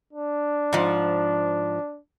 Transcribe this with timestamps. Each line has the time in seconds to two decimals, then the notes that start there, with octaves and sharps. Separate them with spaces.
0.13 D4
0.73 G#2 F3